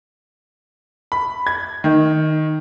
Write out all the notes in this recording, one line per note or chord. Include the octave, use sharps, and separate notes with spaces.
B5
G#6
D#3